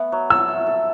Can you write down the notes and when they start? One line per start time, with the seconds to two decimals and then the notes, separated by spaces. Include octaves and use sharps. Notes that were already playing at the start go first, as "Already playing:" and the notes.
Already playing: A3 B3
0.12 F#3
0.30 A4 E6
0.48 E5
0.67 A4